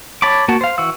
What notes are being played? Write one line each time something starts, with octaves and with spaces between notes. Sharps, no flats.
C#5 A5 B5 D6
A#3 F#4 A5
C5 F5
E3 F#4 E6